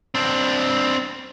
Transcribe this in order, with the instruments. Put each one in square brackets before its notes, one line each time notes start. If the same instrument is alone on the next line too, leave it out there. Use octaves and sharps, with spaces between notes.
[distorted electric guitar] C4 D4